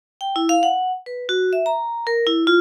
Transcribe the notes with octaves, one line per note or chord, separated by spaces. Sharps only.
G5
E4
F5
F#5
B4
F#4
E5
A#5
A#4
E4
F4